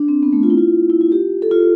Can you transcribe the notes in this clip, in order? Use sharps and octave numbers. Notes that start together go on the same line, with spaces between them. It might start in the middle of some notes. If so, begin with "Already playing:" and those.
Already playing: D4
C4
B3
A3
F4
E4
F4
E4
F4
G4
A4
F4